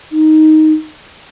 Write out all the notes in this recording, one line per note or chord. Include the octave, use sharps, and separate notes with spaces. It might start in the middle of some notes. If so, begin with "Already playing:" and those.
D#4